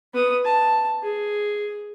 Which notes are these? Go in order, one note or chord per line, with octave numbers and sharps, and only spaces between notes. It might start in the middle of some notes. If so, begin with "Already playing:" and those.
B3 D#6
A5
G#4